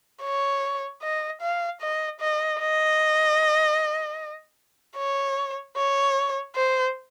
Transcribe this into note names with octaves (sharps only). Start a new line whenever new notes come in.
C#5
D#5
F5
D#5
D#5
D#5
C#5
C#5
C5